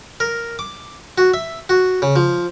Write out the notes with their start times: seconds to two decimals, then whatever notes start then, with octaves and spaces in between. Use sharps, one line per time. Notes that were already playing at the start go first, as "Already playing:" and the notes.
0.20 A#4
0.59 D6
1.18 F#4
1.34 E5
1.69 F#4
2.02 C#3
2.16 F3